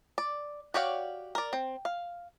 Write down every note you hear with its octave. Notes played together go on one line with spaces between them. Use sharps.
D5
F#4 G4 C#5 D5 F5
A#4 D5
C4
F5